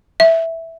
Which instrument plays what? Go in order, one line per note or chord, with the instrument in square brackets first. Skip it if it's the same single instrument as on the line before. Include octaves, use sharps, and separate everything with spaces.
[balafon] E5